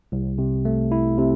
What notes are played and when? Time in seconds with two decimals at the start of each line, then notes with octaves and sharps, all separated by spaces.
0.12 C2
0.38 C3
0.65 A3
0.92 E4
1.18 C3